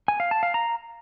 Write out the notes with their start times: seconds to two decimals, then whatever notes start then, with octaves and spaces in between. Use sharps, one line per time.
0.08 G#5
0.20 F5
0.31 A5
0.43 F5
0.54 A#5